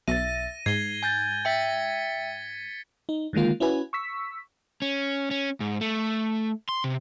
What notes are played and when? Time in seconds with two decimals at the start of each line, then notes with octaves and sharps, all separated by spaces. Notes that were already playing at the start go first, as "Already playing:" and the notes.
0.08 B1 E5 A6 A#6 D#7
0.66 G#2 G#6 C7 G7
1.03 G#5 G6 A6
1.45 E5 G5 A6 B6 C#7
3.09 D#4
3.33 D3 D#3 G#3 A#3 F4
3.60 C#4 E4 F#4 B4 G#5
3.93 C#6 E6 B6
4.82 C#4
5.31 C#4
5.60 G#2
5.81 A3
6.69 C6
6.84 C3